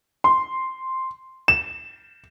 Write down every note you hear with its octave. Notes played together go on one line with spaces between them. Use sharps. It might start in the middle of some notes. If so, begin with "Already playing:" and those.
C6
E7